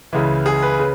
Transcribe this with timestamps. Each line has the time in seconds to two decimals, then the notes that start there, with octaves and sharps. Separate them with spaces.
0.13 C#2 C#3 E3
0.46 G#4
0.62 B4
0.79 C#3